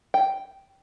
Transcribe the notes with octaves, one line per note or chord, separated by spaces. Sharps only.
G5